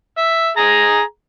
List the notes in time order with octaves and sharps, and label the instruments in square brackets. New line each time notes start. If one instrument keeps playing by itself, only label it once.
[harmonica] E5
G#4 A#5